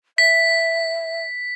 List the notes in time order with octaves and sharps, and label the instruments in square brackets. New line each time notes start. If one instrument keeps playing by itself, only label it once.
[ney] E5 [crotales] B6